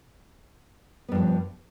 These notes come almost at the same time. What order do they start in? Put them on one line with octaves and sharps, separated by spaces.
B3 G2 F3